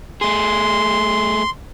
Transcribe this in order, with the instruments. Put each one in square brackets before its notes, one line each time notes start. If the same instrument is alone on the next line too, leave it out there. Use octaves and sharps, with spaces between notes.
[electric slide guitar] A3 G#4 [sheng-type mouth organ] C6